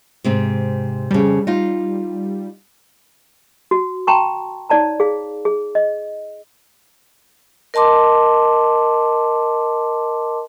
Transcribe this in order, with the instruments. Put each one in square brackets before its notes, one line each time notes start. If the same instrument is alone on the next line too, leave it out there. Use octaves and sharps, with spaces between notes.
[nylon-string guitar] G#2 C3 C4
[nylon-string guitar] F2 C#3 [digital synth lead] G3
[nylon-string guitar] D#4 F4
[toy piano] F#4
G5 A5 A#5 C6 C#6
D#4 C#5 D5 A5 A#5
G#4 F5
G#4
D#5
[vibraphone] A#4 D#5 A5 C6 D6